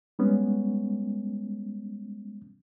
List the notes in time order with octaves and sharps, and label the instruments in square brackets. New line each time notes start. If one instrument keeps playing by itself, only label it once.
[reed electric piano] G3 G#3 B3 C#4